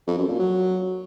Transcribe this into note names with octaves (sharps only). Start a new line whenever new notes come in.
F2
F#2
A#2
F#3